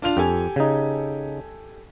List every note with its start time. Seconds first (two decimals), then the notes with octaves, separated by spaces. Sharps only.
0.02 D4 F4 F7
0.17 F2 G4 A4 G#5
0.56 C#3 D#4